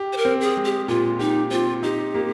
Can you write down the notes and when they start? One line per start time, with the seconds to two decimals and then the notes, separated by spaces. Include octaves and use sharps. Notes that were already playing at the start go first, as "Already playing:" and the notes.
Already playing: G4
0.13 C5
0.17 A#4
0.25 C4
0.41 G#4
0.57 G#3
0.65 G4
0.88 A#2 F4
1.19 D#4 G4
1.51 C4 F4
1.83 D#4 G4
2.14 A#3